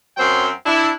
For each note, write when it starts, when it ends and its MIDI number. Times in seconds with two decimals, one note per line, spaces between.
0.17 0.48 42
0.17 0.48 54
0.17 0.48 60
0.17 0.48 72
0.17 0.48 79
0.17 0.48 84
0.66 0.90 62
0.66 0.90 64